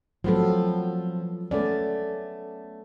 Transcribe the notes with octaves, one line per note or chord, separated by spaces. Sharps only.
F3 F#3 A3 B3 C4 A4
A3 B3 C#4 D5